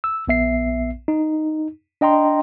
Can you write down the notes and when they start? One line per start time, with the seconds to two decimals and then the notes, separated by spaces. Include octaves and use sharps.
0.04 E6
0.28 A#1 B3 E5 C7
1.08 D#4
2.01 D4 D#5 G5 A#5 C6